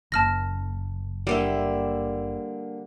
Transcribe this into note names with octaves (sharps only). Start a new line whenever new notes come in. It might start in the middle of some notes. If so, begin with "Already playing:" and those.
F#1 A5 F6 A#6
D3 G3 A#3 E5